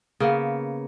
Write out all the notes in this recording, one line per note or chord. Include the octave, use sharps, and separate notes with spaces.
C#3 A#3 B3